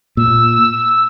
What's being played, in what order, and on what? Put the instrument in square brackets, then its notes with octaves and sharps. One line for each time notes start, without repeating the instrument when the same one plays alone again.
[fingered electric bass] A#2 [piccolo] E6